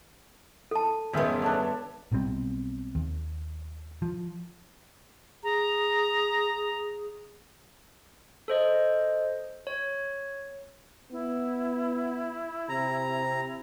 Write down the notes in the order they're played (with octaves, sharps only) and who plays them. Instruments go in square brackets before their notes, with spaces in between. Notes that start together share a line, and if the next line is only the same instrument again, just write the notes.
[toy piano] A4 A5
[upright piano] E1 D#3 C#4 [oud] G2 B3 [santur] G#4 E5 C6
[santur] D4 A4 C#5
[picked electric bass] B1 B2 G3 C4
D#2
F3
[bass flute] G#4 [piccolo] A#5
[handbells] A4 C5 D#5
C#5
[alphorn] B3 [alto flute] E4
[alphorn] C3 [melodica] A#5